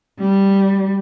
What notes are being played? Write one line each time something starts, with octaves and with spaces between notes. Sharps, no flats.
G3